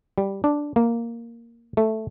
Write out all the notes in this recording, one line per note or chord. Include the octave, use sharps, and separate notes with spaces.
G3
D4
A#3
A3